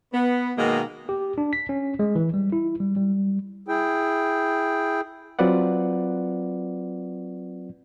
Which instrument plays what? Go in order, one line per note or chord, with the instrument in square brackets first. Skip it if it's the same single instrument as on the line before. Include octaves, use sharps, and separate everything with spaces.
[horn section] B3
B2 D#3 G#3 A#3
[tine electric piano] G4
D4
B6
C#4
G#3
E3
G3
E4
G3
G3
[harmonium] E4 G#4 G5
[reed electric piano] F#3 C4 F4 B4 D5 F#5